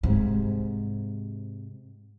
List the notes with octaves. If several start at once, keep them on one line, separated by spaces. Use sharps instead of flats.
G#2 C3